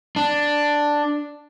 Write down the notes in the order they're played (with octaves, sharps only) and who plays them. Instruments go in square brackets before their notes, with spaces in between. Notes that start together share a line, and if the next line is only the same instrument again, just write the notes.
[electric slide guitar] D4